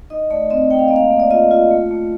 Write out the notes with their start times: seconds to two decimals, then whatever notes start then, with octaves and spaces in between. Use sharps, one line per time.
0.10 D#4 D#5
0.30 A3 D5
0.50 C4 D#5
0.70 A3 G5
0.79 F5
0.88 A#3 D#5
0.96 F5
1.11 A#3
1.20 D5
1.31 F4 D#5
1.51 F4
1.71 A3
1.91 A3